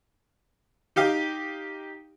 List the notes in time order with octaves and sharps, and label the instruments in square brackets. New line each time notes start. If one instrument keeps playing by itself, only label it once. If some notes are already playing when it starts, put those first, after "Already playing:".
[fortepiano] D#4 G4 F5